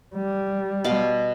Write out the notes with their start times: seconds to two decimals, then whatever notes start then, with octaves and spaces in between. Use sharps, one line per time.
0.16 G3
0.84 B2 F5 D6